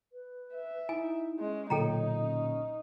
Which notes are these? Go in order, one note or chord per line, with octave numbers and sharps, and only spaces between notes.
B4
E5
D#4 E4 G#5
G#3 C#4
B1 A#2 D3 D#4 A4 C#5 G5 A#5
C#4